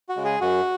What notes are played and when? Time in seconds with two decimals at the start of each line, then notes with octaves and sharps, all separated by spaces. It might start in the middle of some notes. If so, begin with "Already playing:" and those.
0.09 F#4
0.17 C#3 G#3
0.24 G#4
0.41 F#2 F#4